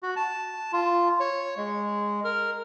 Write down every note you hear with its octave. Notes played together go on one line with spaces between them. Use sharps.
F#4
A5
F4
C#5
G#3
A#4